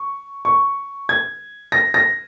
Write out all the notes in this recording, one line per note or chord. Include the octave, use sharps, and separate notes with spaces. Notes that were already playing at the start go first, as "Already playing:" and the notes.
Already playing: C#6
C#6
G#6
A#6
A#6